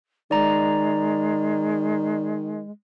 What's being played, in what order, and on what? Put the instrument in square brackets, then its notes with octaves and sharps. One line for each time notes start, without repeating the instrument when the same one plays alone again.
[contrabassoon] D#3 [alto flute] G#3 [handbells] D5 A#5